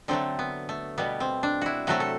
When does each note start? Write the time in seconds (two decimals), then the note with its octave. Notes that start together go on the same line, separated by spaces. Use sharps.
0.08 D3 F#3 A3 C4
0.39 B3
0.69 A3
0.98 B2 G3 B3
1.20 C4
1.43 D4
1.61 E4 F#4
1.87 C3 F#3 A3 F#4
2.00 A4